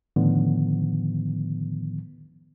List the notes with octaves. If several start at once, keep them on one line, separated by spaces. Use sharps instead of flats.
A2 D3 D#3 F3 B3